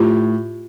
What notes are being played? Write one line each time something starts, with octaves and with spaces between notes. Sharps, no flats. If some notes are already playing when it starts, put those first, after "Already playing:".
Already playing: A2 F4 G4